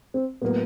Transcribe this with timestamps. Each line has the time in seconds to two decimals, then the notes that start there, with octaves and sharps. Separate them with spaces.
0.14 C4
0.42 A2 F#3 A#3 B3